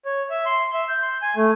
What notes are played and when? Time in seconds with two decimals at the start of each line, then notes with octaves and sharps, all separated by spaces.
0.05 C#5
0.30 E5
0.46 C6
0.74 E5
0.89 G6
1.02 C6
1.22 G#5
1.36 A3